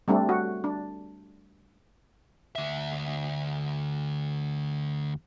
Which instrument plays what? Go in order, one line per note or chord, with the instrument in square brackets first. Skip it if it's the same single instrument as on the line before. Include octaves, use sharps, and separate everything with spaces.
[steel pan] G3 A3 C4 D4
F#4
D4
[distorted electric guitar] D2 E5